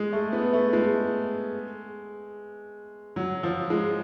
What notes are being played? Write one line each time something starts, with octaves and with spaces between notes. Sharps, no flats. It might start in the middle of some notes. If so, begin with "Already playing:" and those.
Already playing: G#3
A3
B3
A3
G#3
F#3
F3
G#3